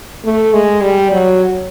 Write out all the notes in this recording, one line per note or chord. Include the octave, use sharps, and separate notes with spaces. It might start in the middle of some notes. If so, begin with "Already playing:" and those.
A3
G#3
G3
F#3